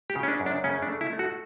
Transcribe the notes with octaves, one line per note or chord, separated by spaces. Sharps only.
G4
C#3
C#4
D4
F#2
D4
C#3 C#4
D4
A3
E4
A3
F#4